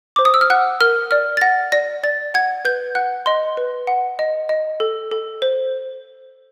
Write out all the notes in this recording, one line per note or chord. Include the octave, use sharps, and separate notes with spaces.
C5 D6
D#6
E6
F6
F#5 F#6
A#4 F6
D5 F6
A6
F#5 A#6
D5 A#6
D5 A6
F#5 G#6
B4 G6
F#5 F#6
D#5 C6
B4
F#5
D#5
D#5
A4
A4
C5